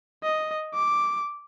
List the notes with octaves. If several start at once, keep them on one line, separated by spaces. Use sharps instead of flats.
D#5
D6